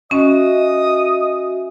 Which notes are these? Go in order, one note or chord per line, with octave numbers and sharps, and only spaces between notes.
C#4 F#4 D#5 E5 G#5 D#6